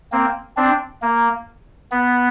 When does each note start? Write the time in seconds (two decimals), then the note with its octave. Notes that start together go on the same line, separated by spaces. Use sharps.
0.12 A#3 C4
0.57 C4 D4
1.02 A#3
1.91 B3